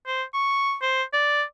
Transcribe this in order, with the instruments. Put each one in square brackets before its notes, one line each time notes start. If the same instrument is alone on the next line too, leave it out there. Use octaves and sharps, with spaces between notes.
[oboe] C5
C#6
C5
D5